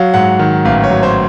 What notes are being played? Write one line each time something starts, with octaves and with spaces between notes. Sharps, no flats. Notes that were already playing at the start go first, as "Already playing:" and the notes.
Already playing: F#3 F5
G#2 F#5
D#3
A1 F5
C#5
F#3
C5